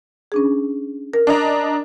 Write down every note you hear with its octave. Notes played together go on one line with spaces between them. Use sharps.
C#4 D4 G#4
A#4
D4 D#5 A#5